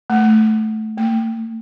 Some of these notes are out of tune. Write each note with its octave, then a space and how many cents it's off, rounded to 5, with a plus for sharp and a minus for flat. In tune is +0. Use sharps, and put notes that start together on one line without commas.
A3 -10
A3 +45